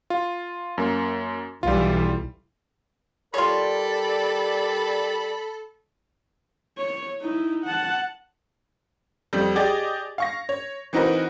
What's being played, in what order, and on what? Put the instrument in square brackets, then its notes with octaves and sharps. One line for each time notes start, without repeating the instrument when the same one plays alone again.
[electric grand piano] F4
F#2 A#3
[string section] B1 E3 [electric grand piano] G3 F4
[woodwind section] G3 A#4 D5 [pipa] F4 C#5 [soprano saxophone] A4 [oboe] B5
[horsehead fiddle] C#5
D#4 E4
F#5 A5
[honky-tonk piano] F2 G3
G4 G#4 D5 D#5 A6
F5 C#6 A#6
C#5
E3 C4 D#4 F#4 A#4 B4